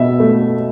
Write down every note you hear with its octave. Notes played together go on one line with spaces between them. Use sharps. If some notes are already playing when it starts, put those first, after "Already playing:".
Already playing: B2 E5
A3